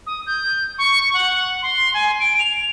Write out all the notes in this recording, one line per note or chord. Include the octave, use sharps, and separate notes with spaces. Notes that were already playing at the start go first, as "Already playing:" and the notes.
D#6
G6
C#6
F#5
C6
G#5
D7
F7